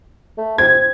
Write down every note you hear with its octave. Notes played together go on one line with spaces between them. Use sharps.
A3
C4 G#6